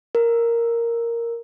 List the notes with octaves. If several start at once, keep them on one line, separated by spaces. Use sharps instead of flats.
A#4